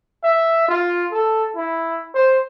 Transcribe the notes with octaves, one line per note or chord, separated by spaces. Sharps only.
E5
F4
A4
E4
C5